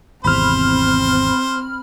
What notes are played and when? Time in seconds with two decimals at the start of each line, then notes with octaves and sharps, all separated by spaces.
0.25 G#1 E2 C3 C4 C5 B5 F6